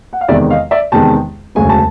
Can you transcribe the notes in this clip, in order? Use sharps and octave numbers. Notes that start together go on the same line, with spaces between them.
F#5
F5
E2 C3 D#3 G#3 B3 D5 E5
D#5 F5
D5 E5
E2 C3 D#3 G#3 B3 G5 A5
E1 D2 C#3 F#3 G#5
A5